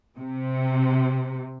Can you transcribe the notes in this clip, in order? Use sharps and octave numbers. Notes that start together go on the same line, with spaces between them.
C3